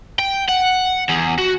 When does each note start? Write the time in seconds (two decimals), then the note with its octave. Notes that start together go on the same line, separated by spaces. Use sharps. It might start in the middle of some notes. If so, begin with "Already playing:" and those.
0.19 G5
0.49 F#5
1.09 E2
1.38 F#4